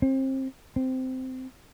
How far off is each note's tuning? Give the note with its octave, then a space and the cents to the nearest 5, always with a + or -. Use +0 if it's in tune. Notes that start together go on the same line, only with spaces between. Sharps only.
C4 +30
C4 -15